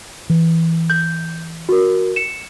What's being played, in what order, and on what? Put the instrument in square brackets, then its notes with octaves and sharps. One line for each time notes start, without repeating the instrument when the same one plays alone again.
[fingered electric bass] E3
[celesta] G6
F#4 A#4
C#7 E7